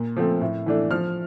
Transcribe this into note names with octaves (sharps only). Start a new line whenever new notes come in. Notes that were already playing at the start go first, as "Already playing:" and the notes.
Already playing: A#2
F3 A3 C4
A2
E3 A3 D4
F3 F6